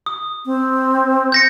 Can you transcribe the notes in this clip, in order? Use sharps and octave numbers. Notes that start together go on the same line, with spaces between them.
D#6
C4
G6 A#6 C#7